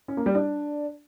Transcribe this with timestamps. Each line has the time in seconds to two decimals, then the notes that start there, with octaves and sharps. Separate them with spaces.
0.08 C#4
0.17 A#3
0.26 G3
0.35 D4